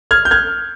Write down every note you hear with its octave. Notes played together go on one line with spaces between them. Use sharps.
F6 G#6
G6
F6 G#6